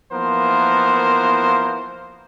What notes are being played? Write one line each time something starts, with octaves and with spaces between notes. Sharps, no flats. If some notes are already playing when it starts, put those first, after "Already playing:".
E3 F3 A#3 B3 A#4 C5